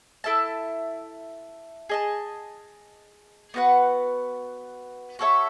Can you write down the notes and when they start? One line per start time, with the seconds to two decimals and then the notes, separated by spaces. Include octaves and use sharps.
0.24 E4 A4 E5 A5
1.89 G#4 D#5 A5
3.54 B3 F#4 B4 F#5
5.19 F#4 A4 C#5 E5